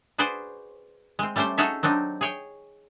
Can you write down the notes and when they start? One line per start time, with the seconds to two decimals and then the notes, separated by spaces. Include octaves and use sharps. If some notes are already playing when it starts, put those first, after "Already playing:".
0.18 F#4 G#4 B4 C5 D5
1.19 G#3 C4
1.36 G3 A3 C#4 G4 C5
1.58 D#4 F#4 G#4 A4 C#5 E5
1.83 F#3 C4 D4 D#4
2.21 G#4 C#5 G5